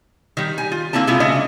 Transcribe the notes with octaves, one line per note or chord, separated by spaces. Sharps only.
D#3 G3
G#5
F4
D3 A#3 C4 E4 A5
C3 G#3 E4 F4
C#3 A3 D4 D#5